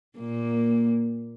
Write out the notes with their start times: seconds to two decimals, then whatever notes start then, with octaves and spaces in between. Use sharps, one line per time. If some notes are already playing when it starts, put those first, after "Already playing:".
0.19 A#2 A#3